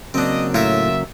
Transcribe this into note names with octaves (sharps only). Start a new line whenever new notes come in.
C#3 F#3 A#3 C4 D4 D#5
A2 F4 A#4 E5